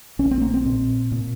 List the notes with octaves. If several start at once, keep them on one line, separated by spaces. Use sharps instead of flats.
A#1 C#4
C4
A#3
C4
A#2
A#2